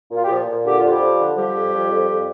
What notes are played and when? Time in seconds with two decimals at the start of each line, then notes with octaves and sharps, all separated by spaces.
0.10 A#2
0.17 F4
0.24 G4
0.29 A#2 F3 F4
0.46 A#2
0.65 D3 G4
0.78 F2 F4
0.90 G3 G4
1.00 F3
1.19 D3
1.36 F3 G3 G4
1.53 F2
1.71 F2
1.89 F2
2.07 F2